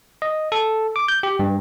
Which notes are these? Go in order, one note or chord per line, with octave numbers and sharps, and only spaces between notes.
D#5
A4
D6
G6
G4
G2